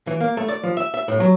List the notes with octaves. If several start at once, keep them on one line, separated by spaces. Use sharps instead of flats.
E3
A#3
A3
D5
F3
E5
E5
A2
F#3